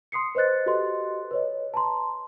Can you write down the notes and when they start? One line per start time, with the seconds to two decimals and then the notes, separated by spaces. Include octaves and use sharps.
0.12 C6 D#6 C7 C#7
0.35 B4 C5 D#5 F#6 A6
0.66 F#4 G4 A4 B4 D#5 C6
1.31 B4 C#5 D#5
1.74 A5 A#5 C6